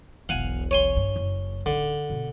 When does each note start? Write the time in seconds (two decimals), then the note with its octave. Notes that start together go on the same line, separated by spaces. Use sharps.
0.29 E1 B1 F5 F#5 G#5
0.71 C#5 G#5 C6
0.97 G2
1.16 F#1
1.66 D1 D3 D#4
2.10 B2